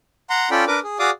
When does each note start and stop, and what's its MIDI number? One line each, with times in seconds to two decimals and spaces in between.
0.30 0.49 78
0.30 0.49 82
0.30 0.49 84
0.51 0.65 61
0.51 0.65 65
0.51 0.65 69
0.51 0.65 74
0.51 0.65 79
0.51 0.65 83
0.67 0.80 62
0.67 0.80 70
0.67 0.80 71
0.67 0.80 86
0.83 0.98 68
0.99 1.10 66
0.99 1.10 68
0.99 1.10 74
0.99 1.10 77
0.99 1.10 86
0.99 1.10 87